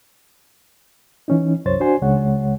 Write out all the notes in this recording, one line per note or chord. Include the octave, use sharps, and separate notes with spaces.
E3 C#4 D#4
C2 F#2 C5 C#5 A6
D4 F#4 C5 G#5 C6
C#2 C#3 G#3 C#5 F#5